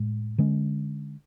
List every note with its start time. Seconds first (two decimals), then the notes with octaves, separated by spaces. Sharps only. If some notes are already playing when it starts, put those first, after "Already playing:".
Already playing: A2 G#3
0.38 D3 G#3 C#4